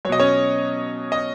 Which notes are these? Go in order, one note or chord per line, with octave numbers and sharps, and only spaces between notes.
B2 F#3 C#5 D#5
C#4 C#5
D#5